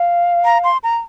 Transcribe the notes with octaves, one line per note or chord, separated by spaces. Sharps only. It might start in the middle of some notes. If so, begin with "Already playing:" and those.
Already playing: F5
A#5
C6
A#5